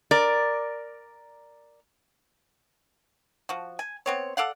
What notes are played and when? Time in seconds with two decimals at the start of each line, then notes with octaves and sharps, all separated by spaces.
0.11 A#4 D5
3.49 F3 F#4
3.79 G#5
4.06 B3 C4 C#5
4.37 A4 D5 F5 F#5